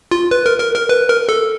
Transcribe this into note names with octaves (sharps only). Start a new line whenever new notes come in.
F4
B4
A#4
A#4
A#4
B4
A#4
A4